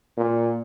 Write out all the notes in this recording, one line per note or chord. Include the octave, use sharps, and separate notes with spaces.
A#2